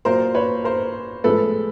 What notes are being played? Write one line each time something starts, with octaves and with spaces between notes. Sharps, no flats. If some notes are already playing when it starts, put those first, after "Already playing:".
A#2 F#3 A#3 A#4 C5
B4 C#5
A#4 C5
A2 F3 G#3 A4 B4